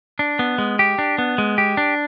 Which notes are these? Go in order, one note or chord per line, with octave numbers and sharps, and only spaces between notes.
D4
B3
G#3
G4
D4
B3
G#3
G4
D4